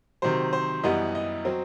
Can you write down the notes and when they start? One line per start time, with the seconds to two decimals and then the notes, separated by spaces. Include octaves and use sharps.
0.22 C3 D#3 F#3 C5
0.53 C5
0.83 F#2 E3 G3 B3 D#5
1.15 D#5
1.45 F#3 C4